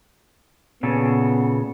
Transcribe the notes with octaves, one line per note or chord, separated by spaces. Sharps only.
A#2 C#3 B3 A4